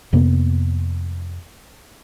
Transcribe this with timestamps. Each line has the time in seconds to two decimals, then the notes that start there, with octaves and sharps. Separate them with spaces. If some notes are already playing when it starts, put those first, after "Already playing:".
0.13 F2 C3 A#3 B3